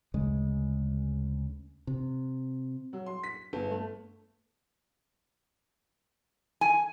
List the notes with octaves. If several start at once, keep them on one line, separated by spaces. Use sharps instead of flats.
D2 C#3 G#3
C3
F#3
C6
B6
G1
A3
G#5